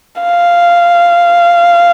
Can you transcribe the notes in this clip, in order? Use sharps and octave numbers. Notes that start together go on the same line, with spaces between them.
F5